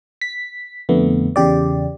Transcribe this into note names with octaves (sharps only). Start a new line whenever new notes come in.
B6
F2 D3 A3 B3
E2 C#3 G4 D5